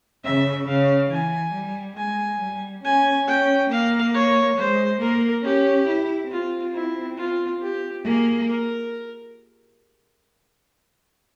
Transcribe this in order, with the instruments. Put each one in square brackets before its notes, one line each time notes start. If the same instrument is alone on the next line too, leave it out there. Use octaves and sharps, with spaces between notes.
[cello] C#3 [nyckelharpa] E5
[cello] C#3 [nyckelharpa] F5
[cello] E3 [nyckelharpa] G#5
[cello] G3
[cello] G#3 [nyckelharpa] G#5
[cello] G3
[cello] C#4 [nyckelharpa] G#5
[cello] C#4 [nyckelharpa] G5
[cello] A#3 [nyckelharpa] F5
[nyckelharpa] C#5
[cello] G#3 [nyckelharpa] C5
[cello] A#3 [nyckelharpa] A#4
[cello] C#4 [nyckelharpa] G4
[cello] E4
[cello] C4 [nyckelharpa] F4
[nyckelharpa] E4
F4
G4
[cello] A#3 [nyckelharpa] G#4
[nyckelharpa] A#4